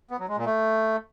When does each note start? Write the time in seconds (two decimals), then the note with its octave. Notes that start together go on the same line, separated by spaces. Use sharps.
0.10 B3
0.19 F#3
0.28 G#3
0.37 A#2
0.46 A3